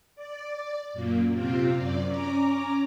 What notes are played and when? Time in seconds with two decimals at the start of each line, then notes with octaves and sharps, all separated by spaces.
0.15 D5
0.93 F#2 A#2 A#3
1.31 C3 C4 F4
1.77 F#2 D5
2.07 C#4 A#5 D6